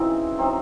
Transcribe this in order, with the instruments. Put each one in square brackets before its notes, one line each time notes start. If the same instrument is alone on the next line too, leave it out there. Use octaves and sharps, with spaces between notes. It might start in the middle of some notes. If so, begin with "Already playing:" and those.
Already playing: [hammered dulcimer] C#3 E3 C4 D#4 F#4
F#3 C4 D#4